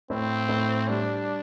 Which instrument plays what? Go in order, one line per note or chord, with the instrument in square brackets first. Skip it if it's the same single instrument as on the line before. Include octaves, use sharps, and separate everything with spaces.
[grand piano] A2 [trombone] C4
[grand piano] A2
[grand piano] G3 [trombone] D4